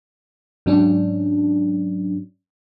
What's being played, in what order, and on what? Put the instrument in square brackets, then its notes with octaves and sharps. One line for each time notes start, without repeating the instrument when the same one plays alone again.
[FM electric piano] G#2 F#3 C#4 D4